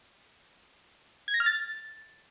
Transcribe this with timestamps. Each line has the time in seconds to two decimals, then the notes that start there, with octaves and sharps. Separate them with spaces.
1.28 G#6
1.34 A#6
1.40 F6
1.46 A6